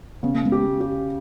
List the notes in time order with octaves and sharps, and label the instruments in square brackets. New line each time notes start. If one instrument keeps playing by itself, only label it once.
[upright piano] C#3 [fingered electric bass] B3
[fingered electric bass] A#3
G#3 B3
[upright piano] G4
G4